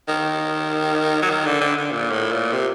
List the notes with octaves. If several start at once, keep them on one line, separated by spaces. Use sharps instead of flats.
D#3
F#3
D#3
D3
D3
D3
A#2
A2
A#2
C3